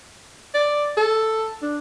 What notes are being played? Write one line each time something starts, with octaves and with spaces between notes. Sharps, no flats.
D5
A4
D4